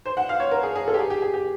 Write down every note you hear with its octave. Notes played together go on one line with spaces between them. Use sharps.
C5
F#5
F5
C#5
A#4
G#4
G#4
A4
G4
G#4
G4
G#4
G4